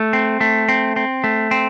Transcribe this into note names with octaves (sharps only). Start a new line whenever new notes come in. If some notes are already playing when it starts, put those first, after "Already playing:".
Already playing: A3
C4
A3
C4
C4
A3
C4